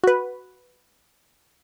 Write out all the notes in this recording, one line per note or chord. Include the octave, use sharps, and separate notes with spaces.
F#4 B4